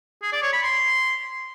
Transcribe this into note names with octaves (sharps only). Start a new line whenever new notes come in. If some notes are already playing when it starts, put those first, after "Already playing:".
G#4
D5
C#5
B5
C6